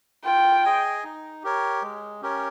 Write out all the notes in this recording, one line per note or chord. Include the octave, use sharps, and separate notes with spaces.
F4 G5
G#4 D#5 G#5
D#4
G4 A#4 C#5
G#3
C#4 G4 A#4 C#5